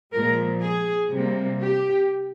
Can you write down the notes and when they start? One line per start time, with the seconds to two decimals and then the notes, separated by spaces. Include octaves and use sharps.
0.12 A#2 F3 G#3 A#4
0.61 G#4
1.11 C3 G3 A#3
1.60 G4